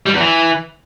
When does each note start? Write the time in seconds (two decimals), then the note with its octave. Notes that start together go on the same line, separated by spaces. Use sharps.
0.06 G3
0.13 E2
0.21 E3